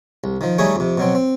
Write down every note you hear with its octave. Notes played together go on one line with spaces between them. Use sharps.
C2
D#3 F3
D#3 G3 A3 D#4 G#4 C#5
F2 C3
B2 F#3 C4
C4